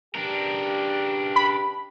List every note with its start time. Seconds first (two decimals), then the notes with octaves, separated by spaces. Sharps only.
0.15 G2 C#3 D4 G4 A#4
1.36 B5